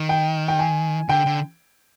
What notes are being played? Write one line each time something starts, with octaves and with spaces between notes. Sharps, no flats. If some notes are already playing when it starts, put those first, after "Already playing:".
Already playing: D#3
G5
G5
G#5
D3 G5
D3